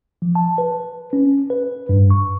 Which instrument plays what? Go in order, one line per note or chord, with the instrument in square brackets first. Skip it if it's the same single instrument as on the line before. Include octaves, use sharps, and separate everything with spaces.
[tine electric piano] F3
A5
B4
C#4
B4
G2
C#6